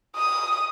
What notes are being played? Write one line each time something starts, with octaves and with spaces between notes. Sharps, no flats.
D#6